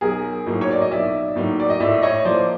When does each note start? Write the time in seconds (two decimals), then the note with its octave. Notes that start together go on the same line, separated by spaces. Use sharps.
0.01 B1 G#4 A#4
0.46 A2 F#3 A#3 D#4
0.61 C#5
0.71 D5
0.81 D#5
0.91 B1 D5 E5
1.36 A2 F#3 A#3 D#4
1.60 D5
1.70 D#5
1.80 A2 D5 E5
2.02 C#5 D#5
2.25 F3 A#3 C5 D5